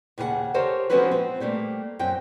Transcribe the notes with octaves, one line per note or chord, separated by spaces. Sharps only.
D#2 C#3 G#4 B4 F#5
G4 A4 A#4 C5 C#5
F3 G#3 C4 C#4 F#4 B4
C4
G3 A3 A#3 G4
F#2 C4 G5